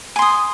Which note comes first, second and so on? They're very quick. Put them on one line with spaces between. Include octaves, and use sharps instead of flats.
G#5 C6 D#6